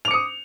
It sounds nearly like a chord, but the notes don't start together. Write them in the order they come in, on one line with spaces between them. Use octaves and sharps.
F7 D6 C#7 D#6